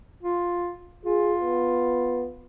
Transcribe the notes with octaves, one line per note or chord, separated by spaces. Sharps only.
F4
F4 G#4
B3